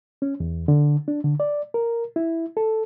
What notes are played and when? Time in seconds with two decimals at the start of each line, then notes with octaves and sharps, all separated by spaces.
0.22 C#4
0.40 E2
0.68 D3
1.08 D4
1.24 D3
1.40 D5
1.74 A#4
2.16 E4
2.57 A4